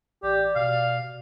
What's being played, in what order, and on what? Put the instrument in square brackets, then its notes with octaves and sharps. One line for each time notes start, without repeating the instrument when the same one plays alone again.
[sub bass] A1 [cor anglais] G4 [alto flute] D5
[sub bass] B2 [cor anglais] F5